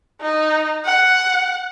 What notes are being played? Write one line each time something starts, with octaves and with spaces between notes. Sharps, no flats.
D#4
F#5